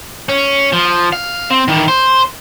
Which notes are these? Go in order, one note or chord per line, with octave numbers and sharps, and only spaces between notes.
C#4
F3
F5
C4
D#3 E3
C5